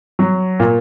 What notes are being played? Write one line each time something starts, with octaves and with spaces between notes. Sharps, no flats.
F#3
A#2